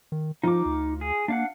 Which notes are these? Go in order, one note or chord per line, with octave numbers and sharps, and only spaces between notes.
D#3
F3 D#4 F4 D6
D2
G#4
A#3 D4 F5 F#5